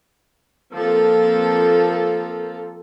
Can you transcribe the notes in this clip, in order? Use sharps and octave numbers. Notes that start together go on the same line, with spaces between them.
F3 A#3 C4 A4